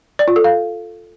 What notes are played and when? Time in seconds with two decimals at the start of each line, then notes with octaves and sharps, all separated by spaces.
0.19 D5
0.28 F4
0.36 A4
0.44 F5